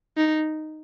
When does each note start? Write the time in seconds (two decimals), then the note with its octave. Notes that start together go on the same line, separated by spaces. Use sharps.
0.17 D#4